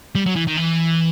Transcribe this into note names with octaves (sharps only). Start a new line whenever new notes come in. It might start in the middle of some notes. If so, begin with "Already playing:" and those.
G3
F#3
E3
D#3
E3